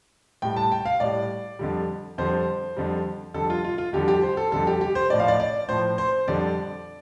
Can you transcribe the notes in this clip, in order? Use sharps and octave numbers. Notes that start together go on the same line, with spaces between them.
A2 G3 G5
A5
G5
F5
A2 G3 D5
F2 D3 G3
F2 D3 G3 C5
F2 D3 G3
F2 D3 G3 A4
F4
F4
F4
F2 D3 G3 G4
G4
C5
A4
F2 D3 G3 A4
G4
G4
C5
A2 F3 D5
F5
D5
D5
A2 F3 C5
C5
F2 D3 G3 D5